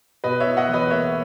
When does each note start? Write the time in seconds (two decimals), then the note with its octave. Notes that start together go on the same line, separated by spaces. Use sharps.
0.24 B2 B4 D#5
0.40 C#5 E5
0.47 E4
0.57 D#5 F#5
0.68 E2
0.73 B4 D#5
0.90 A#3 C#5 E5